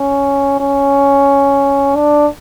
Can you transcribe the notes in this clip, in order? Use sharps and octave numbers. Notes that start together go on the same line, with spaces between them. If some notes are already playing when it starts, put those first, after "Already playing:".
Already playing: C#4
C#4
D4